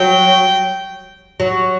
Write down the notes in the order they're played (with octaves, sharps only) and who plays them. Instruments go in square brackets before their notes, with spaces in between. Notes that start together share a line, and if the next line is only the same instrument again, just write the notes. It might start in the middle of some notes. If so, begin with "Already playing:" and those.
Already playing: [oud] F#3 [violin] G5
[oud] F#3